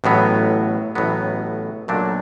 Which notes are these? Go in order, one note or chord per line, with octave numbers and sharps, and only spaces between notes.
A1 A2 F#3 B3
A1 A2 F#3 B3
B1 A#2 F#3 A3 D4